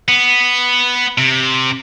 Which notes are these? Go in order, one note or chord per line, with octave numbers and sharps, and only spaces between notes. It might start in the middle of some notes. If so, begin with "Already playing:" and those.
B3
C3